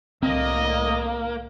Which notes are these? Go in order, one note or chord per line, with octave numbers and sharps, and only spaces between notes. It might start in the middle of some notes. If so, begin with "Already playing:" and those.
C2 A2 D3 A#3 C4 D#5